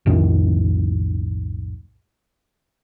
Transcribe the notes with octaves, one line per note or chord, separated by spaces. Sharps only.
B1 F2 A2 D#3